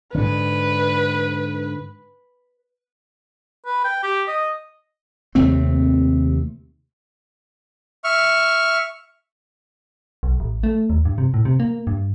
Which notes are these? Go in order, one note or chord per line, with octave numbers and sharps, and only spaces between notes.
G#2 D3 B4
B4
G5
G4
D#5
D#2 C3 A3 C4
E5 C#6 F6
B1
A1
A3
D#2
G2
C3
A2
C3
A#3
G2